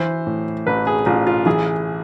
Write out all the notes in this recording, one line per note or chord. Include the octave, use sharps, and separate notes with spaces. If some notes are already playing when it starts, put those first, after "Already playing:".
Already playing: E3 C5
A2
A1 B4
G#4
A1 F4
F4
E3 G#4